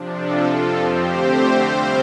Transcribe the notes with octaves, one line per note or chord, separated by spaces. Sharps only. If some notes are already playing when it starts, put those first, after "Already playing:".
Already playing: C3 F3 D4
F4 A4
F2 F3 C4 F4 A4
G4 C5
D3 A3 C4
C3 G3 C4 C5 F5